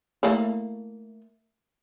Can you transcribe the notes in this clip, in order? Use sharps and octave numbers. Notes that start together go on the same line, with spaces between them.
A3 A#3 E4